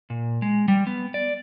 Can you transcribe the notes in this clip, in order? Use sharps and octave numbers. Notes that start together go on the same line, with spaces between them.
A#2
G#3
G3
B3
D5